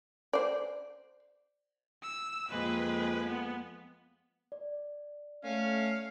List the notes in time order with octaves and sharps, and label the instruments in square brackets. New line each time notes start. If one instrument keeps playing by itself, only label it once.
[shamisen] C5 D5
[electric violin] E6
[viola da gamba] F2 G#3 A#3 [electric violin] B4
[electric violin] B3
[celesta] D5
[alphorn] A3 [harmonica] C#4 [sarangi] F5